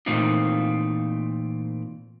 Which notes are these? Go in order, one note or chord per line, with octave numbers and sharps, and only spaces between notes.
A#2 E3 A3 C4 D#4 F4